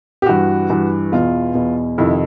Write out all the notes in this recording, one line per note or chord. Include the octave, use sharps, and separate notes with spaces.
G4
G2 E3 F#4
G2 E3
E2 B2 F4
E2 B2
F2 C3 D#3 E4